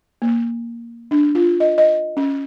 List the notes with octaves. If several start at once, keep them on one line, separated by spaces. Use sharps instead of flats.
A#3
D4
F4
D#5
D#5
C#4